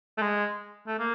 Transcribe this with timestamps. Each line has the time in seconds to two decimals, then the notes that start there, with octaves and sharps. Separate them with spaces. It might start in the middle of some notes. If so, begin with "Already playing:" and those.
0.18 A3
0.22 G#3
0.87 A3
0.99 A#3